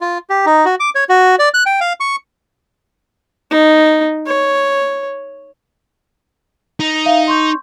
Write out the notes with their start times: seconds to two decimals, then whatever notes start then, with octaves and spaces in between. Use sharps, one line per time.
0.01 F4
0.30 G4
0.46 D#4
0.65 F#4
0.80 D6
0.95 C#5
1.09 F#4
1.39 D5
1.54 F#6
1.66 G5
1.81 F5
2.00 C#6
3.51 D#4
4.26 C#5
6.80 D#4
7.05 E5 F5
7.27 C6 C#6 G6